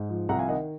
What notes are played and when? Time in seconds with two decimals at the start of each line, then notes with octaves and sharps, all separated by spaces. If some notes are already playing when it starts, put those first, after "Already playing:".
Already playing: G#2
0.10 F3
0.29 C2 F#5 A#5
0.39 F5 G#5
0.48 D#3 D#5 F#5